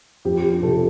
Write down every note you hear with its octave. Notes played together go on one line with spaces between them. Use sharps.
F2 G4
G4
C3 F3 A4